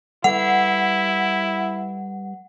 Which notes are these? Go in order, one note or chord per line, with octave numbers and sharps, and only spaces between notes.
G3 E4 A4 B4 F#5